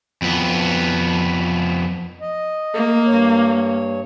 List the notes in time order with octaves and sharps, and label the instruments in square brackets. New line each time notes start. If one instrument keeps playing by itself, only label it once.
[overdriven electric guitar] F2 B3
[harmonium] D#5
[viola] A#3
[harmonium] G2 C#5